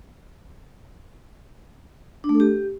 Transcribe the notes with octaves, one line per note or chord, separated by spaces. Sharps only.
D4
A3
A4
G4